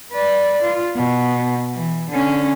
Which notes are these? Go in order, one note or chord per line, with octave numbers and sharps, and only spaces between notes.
B4 D5
F4
B2
E3
D3 C#4